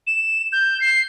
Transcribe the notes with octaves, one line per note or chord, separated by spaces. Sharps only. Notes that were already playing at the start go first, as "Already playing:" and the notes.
E7
G6
C7